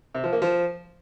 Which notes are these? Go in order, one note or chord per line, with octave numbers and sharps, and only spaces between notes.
C3
F3
A#3
F3